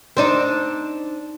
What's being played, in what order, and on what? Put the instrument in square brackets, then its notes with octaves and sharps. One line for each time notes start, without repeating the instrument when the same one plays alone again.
[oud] C4 D4 D#4